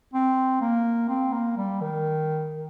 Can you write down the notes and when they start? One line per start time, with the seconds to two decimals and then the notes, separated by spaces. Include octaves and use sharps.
0.13 C4
0.61 A#3
1.09 C4
1.33 A#3
1.57 G3
1.81 D#3
2.52 D#3